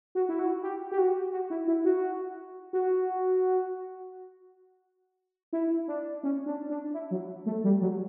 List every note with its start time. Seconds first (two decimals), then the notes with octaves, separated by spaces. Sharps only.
0.15 F#4
0.29 E4
0.39 F#4
0.63 G4
0.92 G4
0.98 F#4
1.33 F#4
1.50 E4
1.67 E4
1.85 F#4
2.73 F#4
5.53 E4
5.88 D4
6.23 C#4
6.46 D4
6.70 D4
6.94 E4
7.11 F#3
7.46 A3
7.64 G3
7.81 F#3